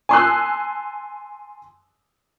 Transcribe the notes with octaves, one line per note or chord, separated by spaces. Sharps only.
G#5 A5 C6 D#6 E6 F#6